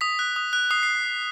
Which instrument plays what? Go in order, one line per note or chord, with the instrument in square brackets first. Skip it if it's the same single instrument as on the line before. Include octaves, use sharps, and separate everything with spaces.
[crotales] D#6 B6
F#6
D#6
F#6
D#6 C7
C7